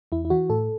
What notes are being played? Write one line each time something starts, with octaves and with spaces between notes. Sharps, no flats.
E2 E4
E4
E3 F#4
A2 A4